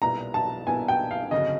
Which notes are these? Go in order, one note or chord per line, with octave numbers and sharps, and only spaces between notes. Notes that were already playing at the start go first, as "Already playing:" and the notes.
B1 A#2 G3 B3 E4 A#5
A5
B1 A#2 G3 B3 E4 G#5
G5
F5
G1 F2 C#3 F#3 D#5